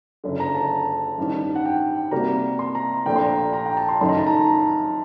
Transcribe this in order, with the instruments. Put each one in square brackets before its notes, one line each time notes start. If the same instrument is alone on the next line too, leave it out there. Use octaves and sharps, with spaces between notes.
[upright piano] F#1 F#2 D3
[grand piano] A#5
A5
[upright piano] A1 G2 D#3
[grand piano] F#5
G5
[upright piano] C3 G3 A#3 F#4 [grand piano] A#5
[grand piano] C6
A#5
[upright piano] A#1 A#2 A3 D4 A4 [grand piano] G5
[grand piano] C6
A#5
A#5
G5
A5
C6
[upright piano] F#1 F#2 D#3 A3 D#4 [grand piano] C6
[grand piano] A#5
A5
A#5